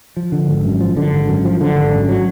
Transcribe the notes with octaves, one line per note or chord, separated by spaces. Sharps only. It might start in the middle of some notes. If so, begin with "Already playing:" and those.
F3
D3
G#1
F#2
F3
D3
G#1
F#2
F3
D3
G#1
F#2
F#3